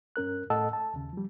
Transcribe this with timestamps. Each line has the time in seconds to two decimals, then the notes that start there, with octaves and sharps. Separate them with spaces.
0.16 G2 C#4 A#4 F#6
0.50 A2 A4 D#5 F#5 A5 E6
0.73 A5
0.94 D#2 C#3
1.13 F3 G3